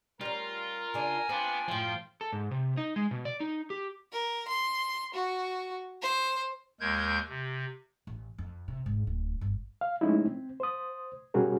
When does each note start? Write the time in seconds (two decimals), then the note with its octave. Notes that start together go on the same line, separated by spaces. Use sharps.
0.21 G3 C#4 F4 A#4
0.94 C#3 D4 G#5
1.29 F3 B3 C4 D4
1.68 F#2 A2 F3 F4 G5
2.21 A4
2.32 G#2
2.51 C3
2.77 D#4
2.96 G#3
3.11 B2
3.25 D5
3.40 D#4
3.70 G4
4.12 A#4
4.48 C6
5.14 F#4
6.02 C5
6.80 D#2 G#3 A#4 G6 G#6
7.29 C3
8.07 A1
8.38 F2
8.68 C3
8.86 G#1
9.07 D1
9.41 G1
9.81 F5
10.01 F3 G#3 A3 C#4 D#4 E4
10.25 C4
10.60 C5 D#6
11.34 B2 G3 C#4 F#4 G#4 A#4